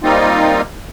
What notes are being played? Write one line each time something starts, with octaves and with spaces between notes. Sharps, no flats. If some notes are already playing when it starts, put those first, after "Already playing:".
G3 A#3 C4 D#4 F4